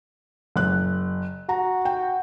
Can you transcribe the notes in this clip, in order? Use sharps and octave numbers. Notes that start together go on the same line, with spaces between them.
F#1 F#6
F#4 A#5
G5